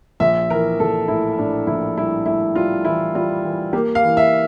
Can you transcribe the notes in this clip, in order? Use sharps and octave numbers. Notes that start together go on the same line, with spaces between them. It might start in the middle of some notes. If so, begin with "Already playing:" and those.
A#1 E5
E3 A#4
A#1 A4
A2 E4
A2 D4
A#1 E4
G3 E4
A2 E4
G3 F4
E3 E4
G3 F4
E3
A#3 G4
F5
E3
E5